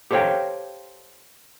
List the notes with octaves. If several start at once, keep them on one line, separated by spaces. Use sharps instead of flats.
G4 A4 C5 C#5 F5 G5